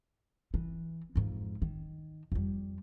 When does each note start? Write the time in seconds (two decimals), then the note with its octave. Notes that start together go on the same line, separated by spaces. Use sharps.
0.54 E3
1.16 F2 G#2
1.62 D#3
2.32 F2 G3